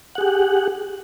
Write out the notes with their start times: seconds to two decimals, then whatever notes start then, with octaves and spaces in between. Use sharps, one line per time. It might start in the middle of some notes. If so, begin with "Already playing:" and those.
0.15 F#5
0.18 G#4
0.21 G4